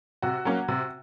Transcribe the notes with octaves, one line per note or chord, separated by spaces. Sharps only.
C3 F#4
F#3 A#3 C#4
C3